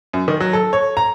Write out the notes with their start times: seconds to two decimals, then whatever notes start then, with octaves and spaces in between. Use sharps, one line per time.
0.13 F#2
0.28 D#3
0.40 F#3
0.53 A4
0.73 C#5
0.97 A#5